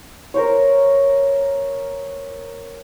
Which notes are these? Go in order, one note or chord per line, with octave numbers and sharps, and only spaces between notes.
A#4 C5 C#5